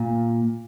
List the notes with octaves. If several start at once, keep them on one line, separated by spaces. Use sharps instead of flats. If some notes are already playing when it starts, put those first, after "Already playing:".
Already playing: A#2